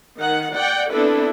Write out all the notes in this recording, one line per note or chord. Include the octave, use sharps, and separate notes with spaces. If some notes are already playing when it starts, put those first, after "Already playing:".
D#3 D#4 F#5
D5 F#5 G5
B3 C4 D4 E4 A4 B4